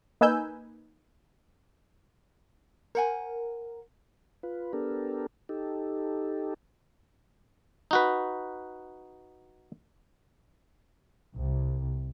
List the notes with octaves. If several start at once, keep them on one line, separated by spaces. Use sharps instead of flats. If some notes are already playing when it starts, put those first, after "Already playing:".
A#3 D#4 B4 G#5 E6 G6
A#4 C5 F#5 G#5
F4 B4
B3 D4 G4 A4 A#4
D#4 G4 A4
D#4 F#4 B4
C2